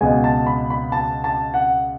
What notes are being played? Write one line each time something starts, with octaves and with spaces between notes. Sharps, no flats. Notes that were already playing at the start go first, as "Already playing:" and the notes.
C#2 B2 G#3 G#5
A5
B5
B5
A5
A5
F#5